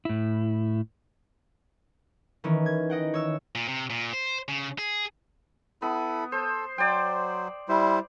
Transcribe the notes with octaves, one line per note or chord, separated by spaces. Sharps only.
A2 E4
D#3 E3 C#4
G#6
D#5 F#5 G5
C#5 E6
A#2
C3
A#2
C5
C#3
G#4
B3 E4 A4 B5
A4 C5
F#3 C5 D5 G5
G3 E4 C5